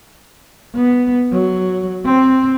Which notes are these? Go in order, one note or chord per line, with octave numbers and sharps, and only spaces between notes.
B3
F#3
C4